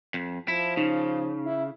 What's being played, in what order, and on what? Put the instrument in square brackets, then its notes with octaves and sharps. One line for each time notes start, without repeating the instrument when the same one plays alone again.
[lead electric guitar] F2
[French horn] F3 [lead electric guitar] E4
[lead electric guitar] C#3 [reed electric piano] D#4
[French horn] E4